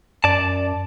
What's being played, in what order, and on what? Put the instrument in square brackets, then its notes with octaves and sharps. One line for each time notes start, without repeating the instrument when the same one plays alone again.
[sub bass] F#2 [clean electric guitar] D5 A5